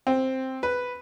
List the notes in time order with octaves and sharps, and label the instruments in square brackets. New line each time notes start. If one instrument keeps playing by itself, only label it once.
[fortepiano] C4
B4